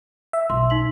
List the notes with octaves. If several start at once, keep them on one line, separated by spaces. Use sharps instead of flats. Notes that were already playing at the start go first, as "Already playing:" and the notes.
E5
B1 C6
D#4 B6 F#7